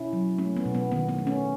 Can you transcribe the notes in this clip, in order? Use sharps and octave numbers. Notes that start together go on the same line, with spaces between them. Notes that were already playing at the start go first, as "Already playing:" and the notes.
Already playing: B2 C#4 E4
F#3
A3 C#4
B3
B2
B3
D#3 B3
B3
A3
C#4